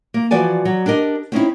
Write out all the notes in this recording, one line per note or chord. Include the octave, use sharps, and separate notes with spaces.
A#3
E3 F3 F#4 D5 G#5
F#3
D4 G4 A#4 D#5
C4 C#4 D#4 E4